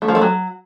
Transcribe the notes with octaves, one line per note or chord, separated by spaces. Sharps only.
A3
F3
A3
F#3